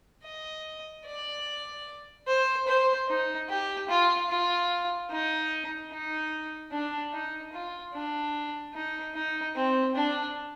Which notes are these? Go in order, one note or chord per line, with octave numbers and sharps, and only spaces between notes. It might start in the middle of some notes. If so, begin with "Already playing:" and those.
D#5
D5
C5
C5
D#4
G4
F4
F4
D#4
D#4
D4
D#4
F4
D4
D#4
D#4
C4
D4